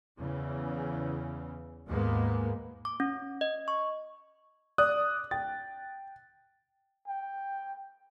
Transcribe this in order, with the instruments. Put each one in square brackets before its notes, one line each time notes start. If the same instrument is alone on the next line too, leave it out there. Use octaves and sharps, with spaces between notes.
[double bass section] E2 C#3 E3
D#2 G#2 G#3 A#3 B3
[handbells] D6
C#4
D#5
C#6
[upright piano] D5 [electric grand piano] D#6 F#6
[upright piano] G5 [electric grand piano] A6
[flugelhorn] G5